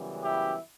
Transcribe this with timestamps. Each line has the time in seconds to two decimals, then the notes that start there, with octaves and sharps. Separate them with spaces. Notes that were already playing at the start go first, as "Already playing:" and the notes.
Already playing: F#2 C#3 E3 G3 B3
0.22 E4 G4